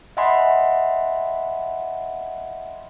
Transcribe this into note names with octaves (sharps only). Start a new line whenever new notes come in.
D#5 E5 F#5 G#5 B5 C6